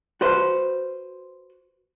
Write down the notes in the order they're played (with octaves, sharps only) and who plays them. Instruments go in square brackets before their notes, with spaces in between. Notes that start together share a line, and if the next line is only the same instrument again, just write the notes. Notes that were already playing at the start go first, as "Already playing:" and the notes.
[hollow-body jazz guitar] F#4 B4 C5